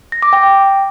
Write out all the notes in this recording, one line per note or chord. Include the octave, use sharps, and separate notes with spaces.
A#6
D6
G5